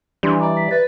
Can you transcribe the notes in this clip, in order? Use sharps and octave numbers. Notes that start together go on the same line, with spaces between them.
E3 G3 D4 C6
D5 D#5 A#5 D6
B6
B4 A6